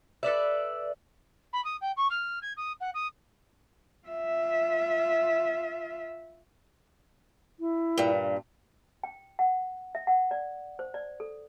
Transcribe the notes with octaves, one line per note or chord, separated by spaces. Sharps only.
A4 B4 D5 E5
B5
D#6
G5
C#6
F6
G#6
D#6
F#5
D#6
F4 E5
E4
G2 A#2
G5
F#5
E5
F#5
D5
C5
D5
A4